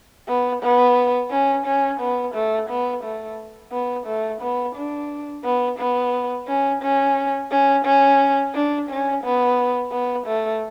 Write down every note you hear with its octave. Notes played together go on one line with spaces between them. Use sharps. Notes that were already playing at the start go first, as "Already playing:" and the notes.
B3
B3
C#4
C#4
B3
A3
B3
A3
B3
A3
B3
D4
B3
B3
C#4
C#4
C#4
C#4
D4
C#4
B3
B3
A3